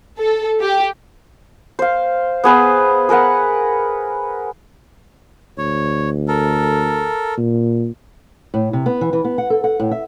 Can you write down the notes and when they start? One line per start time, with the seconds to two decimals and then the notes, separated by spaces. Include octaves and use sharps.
0.19 A4
0.61 G4
1.79 C5 F5
2.44 B3 G#4 B4 C5
3.09 G#4 A#4 B4 F#5
5.58 D2 C#5
6.28 A4 A#4
7.38 A#2
8.54 A2
8.73 C3
8.86 B3
9.01 E3
9.13 E3
9.25 B3
9.38 F#5
9.50 A4
9.64 F#5
9.80 A2
9.91 E5